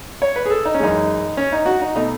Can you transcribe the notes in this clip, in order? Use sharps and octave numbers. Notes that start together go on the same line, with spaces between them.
C#5
B4
G#4
A4
D#4
C#4
F#2 E3 G#3 D#4
C#4
D#4
F#4
D#4
B2 A3 D#4